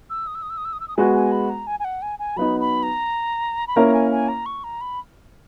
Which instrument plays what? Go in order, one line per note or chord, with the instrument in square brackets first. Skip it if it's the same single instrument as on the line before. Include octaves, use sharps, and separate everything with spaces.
[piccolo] E6
D#6
E6
D#6
E6
D#6
E6
D#6
E6
D#6
[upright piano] G#3 B3 F#4 [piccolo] G#5
[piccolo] G#5
B5
A#5
G#5
G#5
F#5
G#5
G#5
[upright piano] F#3 B3 D#4 [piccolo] B5
[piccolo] B5
A#5
B5
[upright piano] A#3 C#4 E4 A#4 [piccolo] A#5
[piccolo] A#5
G#5
G#5
A#5
C#6
A#5
B5